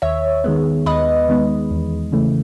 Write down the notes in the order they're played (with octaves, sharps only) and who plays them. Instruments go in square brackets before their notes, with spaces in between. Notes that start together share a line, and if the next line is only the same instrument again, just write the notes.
[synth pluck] D#2 C#5 E5
D#3 G#3 B3
D#2 B4 D#5
D#3 G#3 B3
E2
C#3 E3 A3